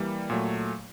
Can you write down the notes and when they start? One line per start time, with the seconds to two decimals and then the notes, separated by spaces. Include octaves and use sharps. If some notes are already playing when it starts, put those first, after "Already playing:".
Already playing: E3 G3 A#3
0.30 A#2 F#3 A3